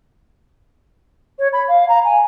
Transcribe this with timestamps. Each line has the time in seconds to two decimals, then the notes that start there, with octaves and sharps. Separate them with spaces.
1.39 C#5
1.53 B5
1.68 F5
1.89 A#5
2.05 G#5